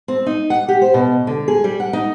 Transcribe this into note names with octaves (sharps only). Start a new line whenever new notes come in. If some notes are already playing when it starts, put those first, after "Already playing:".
C4
D#4
F#5
G4
C5
B2
D3
G#4
G3
F#5
D#4